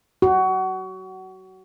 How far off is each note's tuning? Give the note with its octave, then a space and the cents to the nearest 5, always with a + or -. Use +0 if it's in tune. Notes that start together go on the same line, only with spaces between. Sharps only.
F#4 +25